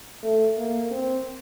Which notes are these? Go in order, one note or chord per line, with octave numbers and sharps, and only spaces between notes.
A3
A#3
C4